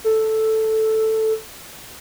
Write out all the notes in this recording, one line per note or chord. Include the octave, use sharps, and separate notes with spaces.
A4